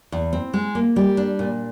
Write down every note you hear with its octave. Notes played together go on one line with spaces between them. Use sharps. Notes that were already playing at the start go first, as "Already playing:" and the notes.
E2
C4
G#3
A#3
G3
D4
A#2